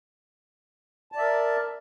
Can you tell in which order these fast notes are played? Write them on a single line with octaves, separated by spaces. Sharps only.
A5 D5 E5 A#4